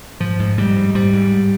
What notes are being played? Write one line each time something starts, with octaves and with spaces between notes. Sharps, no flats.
G#2 F3
G#2
G#2 G3
G#2
G#2 G3
G#2
G#2